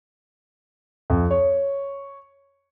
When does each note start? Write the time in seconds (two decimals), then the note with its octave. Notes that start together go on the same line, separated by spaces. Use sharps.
1.10 F2
1.31 C#5